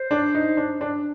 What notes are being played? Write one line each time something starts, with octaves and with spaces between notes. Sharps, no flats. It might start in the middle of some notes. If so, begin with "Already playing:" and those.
Already playing: C5
D4
D#4
D4
D4